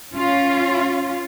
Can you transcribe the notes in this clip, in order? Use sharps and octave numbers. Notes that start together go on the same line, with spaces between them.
C#4 F4